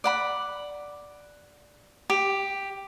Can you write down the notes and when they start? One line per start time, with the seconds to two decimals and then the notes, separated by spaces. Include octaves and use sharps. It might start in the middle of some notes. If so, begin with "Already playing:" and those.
0.04 D5 F#5 B5
2.10 G4